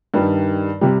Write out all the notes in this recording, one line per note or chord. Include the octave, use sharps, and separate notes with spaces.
G2 D#3 G3
C3 G3